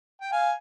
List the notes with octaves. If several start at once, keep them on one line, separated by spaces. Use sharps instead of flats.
G5
F5 G#5